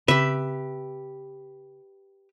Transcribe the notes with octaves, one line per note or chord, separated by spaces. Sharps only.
C#3 C4 G4 B4 E5